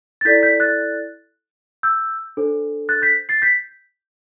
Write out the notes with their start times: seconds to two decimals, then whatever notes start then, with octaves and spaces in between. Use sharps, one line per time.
0.21 A6
0.25 E4 A4 D5 G6 B6
0.43 G6 B6
0.60 F#6 A6
1.83 E6 G6
2.37 D4 A4 C5
2.89 F#6 A6
3.02 G6 B6
3.29 A6 C7
3.42 G6 B6